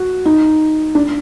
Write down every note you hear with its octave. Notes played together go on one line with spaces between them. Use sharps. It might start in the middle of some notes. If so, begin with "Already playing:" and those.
Already playing: F#4
D#4
D4